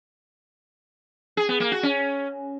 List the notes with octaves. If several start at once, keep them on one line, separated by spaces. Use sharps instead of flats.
G#4
B3
A#3
F#4
C#4